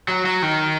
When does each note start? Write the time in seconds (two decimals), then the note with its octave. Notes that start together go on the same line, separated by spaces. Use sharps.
0.08 F#3
0.26 F#3
0.42 D#3